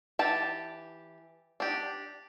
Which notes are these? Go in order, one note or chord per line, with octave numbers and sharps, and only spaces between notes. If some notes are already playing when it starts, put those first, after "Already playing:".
E3 G4 A5
D4 G4